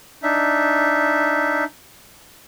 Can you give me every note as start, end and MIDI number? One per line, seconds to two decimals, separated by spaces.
0.23 1.64 62
0.23 1.64 63
0.23 1.64 76